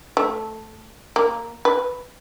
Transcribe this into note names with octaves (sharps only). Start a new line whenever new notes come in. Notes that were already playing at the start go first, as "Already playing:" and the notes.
A3
A#3
B4